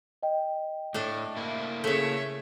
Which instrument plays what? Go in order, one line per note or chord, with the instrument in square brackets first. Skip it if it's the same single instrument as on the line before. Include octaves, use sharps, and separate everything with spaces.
[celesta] D#5 G5
[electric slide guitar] A2 [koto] A3 D4
[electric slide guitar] A#3 E4
[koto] C#3 A3 [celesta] A4 C#7 [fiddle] C#5 E5